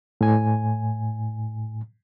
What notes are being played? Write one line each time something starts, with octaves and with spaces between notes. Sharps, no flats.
A2 G#5